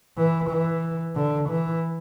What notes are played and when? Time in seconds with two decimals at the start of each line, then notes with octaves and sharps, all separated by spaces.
0.18 E3
0.50 E3
1.16 D3
1.49 E3